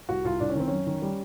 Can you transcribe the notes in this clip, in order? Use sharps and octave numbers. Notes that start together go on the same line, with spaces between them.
C2 F#4
C2 F4
C2 D4
C#4
D#3 C4
F#2 C#4
D#3
G3